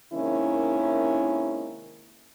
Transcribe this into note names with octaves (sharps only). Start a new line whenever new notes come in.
C3 D#3 G#3 A#3 C#4 E4